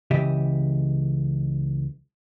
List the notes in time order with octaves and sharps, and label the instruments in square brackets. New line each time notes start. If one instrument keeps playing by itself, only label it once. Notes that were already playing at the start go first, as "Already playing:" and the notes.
[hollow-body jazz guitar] C#2 C#3 E3 G4 D#5 E5